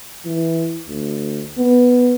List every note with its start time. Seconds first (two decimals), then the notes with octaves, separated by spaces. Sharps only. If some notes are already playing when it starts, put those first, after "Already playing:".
0.25 E3
0.88 D2
1.58 B3